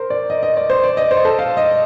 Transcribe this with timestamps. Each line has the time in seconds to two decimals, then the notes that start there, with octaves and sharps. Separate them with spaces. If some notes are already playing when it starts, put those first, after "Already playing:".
Already playing: A#4 C5
0.10 D5
0.30 D#5
0.43 D#5
0.57 D5
0.70 C5
0.84 D5
0.97 D#5
1.11 C5
1.25 A4
1.39 F5
1.57 D#5